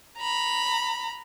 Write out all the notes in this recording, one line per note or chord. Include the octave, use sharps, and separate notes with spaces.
A#5 B5